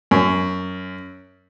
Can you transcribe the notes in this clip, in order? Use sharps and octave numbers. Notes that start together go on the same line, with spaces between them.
F#2